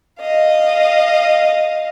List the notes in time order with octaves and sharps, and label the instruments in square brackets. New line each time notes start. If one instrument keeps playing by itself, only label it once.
[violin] D#5 F5